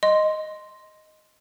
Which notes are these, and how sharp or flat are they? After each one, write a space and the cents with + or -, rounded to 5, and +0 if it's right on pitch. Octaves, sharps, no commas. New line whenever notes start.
D#5 +0 C6 +0